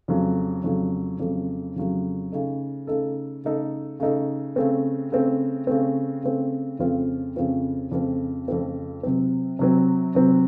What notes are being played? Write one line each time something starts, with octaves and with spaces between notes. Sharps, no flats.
F2 C#3 F#3 A3
F2 C#3 F#3 A3
F2 C#3 F#3 A3
F2 C#3 F#3 A3
C#3 A3 D#4 A4
C#3 A3 D#4 A4
C#3 A3 D#4 A4
C#3 A3 D#4 A4
C#3 A3 C4
C#3 A3 C4
C#3 A3 C4
C#3 A3 C4
F2 C#3 A3 C4 F4
F2 C#3 A3 C4 F4
F2 C#3 A3 C4 F4
F2 C#3 A3 C4 F4
C3 F#3 C4
C3 F#3 C4
C3 F#3 C4